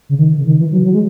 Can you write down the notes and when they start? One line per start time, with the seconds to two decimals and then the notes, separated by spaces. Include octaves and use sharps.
0.09 C#3
0.19 D#3
0.37 C#3
0.47 D#3
0.59 E3
0.72 F#3
0.84 F#3
0.94 G#3